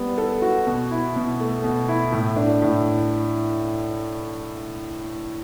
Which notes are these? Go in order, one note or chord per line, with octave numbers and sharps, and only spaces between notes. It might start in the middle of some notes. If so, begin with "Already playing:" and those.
Already playing: G3 B3
A4
F#4
B2
E4
B2
A3
B2
E4
A2
D4
A2